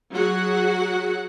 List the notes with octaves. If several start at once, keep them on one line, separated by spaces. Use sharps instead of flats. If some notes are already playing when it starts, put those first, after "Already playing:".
F#3 F#4 G#4 F#5